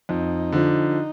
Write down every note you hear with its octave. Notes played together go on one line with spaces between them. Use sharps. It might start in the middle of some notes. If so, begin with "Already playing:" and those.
F2 D#4
D3 F3